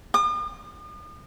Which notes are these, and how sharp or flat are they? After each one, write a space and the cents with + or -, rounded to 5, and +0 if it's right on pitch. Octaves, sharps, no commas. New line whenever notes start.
D#6 -45